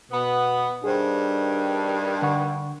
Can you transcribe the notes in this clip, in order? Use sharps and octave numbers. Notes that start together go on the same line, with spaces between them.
B2 B3
G2 D#3 G3 D4 G#4 C5
D3 F#5 C#6